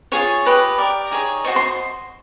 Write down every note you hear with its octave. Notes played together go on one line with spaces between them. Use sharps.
F4 G#4 C#5 C#6
G4 B4 D#5
G4 A#4 D5
D#4 G#4 C#5
F#4 A4 C5 D#5 C#6
C6